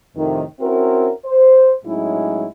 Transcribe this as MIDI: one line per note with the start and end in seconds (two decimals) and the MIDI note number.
0.16 0.43 41
0.16 0.43 45
0.16 0.43 48
0.16 0.43 51
0.60 1.10 60
0.60 1.10 61
0.60 1.10 64
0.60 1.10 66
0.60 1.10 70
1.26 1.72 72
1.85 2.45 45
1.85 2.45 54
1.85 2.45 56
1.85 2.45 61
1.85 2.45 63
1.85 2.45 64